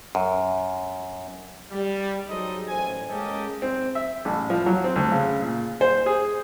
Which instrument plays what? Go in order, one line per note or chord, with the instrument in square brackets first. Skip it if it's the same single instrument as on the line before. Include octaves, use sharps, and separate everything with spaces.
[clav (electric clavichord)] F#2
[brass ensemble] G3
F#3 D#4 G#4 A4 C5 D#5
A1 D#2 C5 G#5
G#3 A#3 C#4 G4 A4 D#5
[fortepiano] C4
E5
A1
F3
F#3
C4
D2
C#3
A#2
C5
G#4